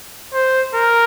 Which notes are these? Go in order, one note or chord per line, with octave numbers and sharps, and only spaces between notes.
C5
A#4